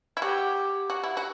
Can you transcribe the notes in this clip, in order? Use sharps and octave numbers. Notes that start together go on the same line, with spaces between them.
E4
F#4 G4
F#4
E4
F#4